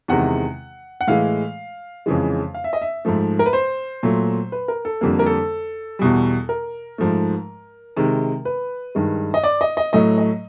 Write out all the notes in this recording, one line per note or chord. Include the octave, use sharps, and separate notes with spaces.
E2 C3 D#3 G#3 F#5
F#5
A2 E3 G#3 F5
F2 C#3 E3 G#3
F5
E5
D#5
E5
G#2 F3 A3
A#4
B4
C5
A#2 F#3 A3
B4
A#4
A4
F2 D3 G3 A#3
A#4
A4
E2 B2 G3
A#4
G#2 F3 A3
C3 D#3 G#3
B4
G2 D#3 G#3
D#5
D5
D#5
D#5
A2 F#3 A3 D#5
D#5